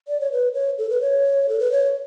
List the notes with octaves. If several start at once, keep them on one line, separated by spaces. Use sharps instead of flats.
D5
C#5
B4
C#5
A4
B4
C#5
A4
B4
C#5